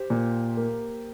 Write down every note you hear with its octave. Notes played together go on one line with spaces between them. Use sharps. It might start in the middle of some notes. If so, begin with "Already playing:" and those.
Already playing: G4 C5
A#2
A#3